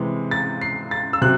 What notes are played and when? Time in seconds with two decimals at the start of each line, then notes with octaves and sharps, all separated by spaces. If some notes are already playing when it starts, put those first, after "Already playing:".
Already playing: C3 E3 G#3
0.31 A6
0.61 C7
0.91 A6
1.13 E6
1.21 C3 F#3 F#6